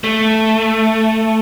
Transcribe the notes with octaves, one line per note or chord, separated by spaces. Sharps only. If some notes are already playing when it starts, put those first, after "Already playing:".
A3